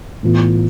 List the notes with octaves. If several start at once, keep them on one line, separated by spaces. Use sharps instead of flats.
A2 E3 B3 F4